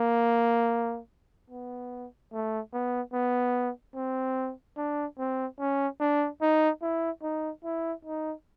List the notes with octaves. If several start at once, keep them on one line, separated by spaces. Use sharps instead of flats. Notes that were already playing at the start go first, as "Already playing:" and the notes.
Already playing: A#3
B3
A3
B3
B3
C4
D4
C4
C#4
D4
D#4
E4
D#4
E4
D#4